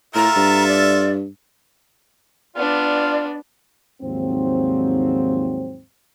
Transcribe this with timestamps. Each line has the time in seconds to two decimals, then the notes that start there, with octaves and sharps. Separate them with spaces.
0.15 A2 F4 A4 E5 A#5
0.36 G2
0.68 D5
2.56 B3 D4 F4 D5
4.02 D#2 G#2 F3 F#3 C4